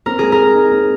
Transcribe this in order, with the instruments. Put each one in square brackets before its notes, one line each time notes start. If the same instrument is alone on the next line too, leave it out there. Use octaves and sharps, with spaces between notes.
[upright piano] C4 [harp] A#4
[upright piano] G#3 [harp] G#4
[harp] A#4
[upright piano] G#3
D#4
C4